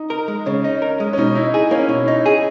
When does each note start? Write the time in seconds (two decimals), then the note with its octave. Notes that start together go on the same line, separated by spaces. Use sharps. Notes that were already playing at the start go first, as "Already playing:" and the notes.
Already playing: D#4
0.10 A#4
0.28 G#3
0.46 C#3 C#4
0.64 D#4
0.82 A#4
1.00 G#3
1.13 C#4
1.18 B2 D#4
1.35 D#4 E4
1.54 G#4
1.71 A#3 C#4
1.89 B2 E4
2.08 D#4
2.26 G#4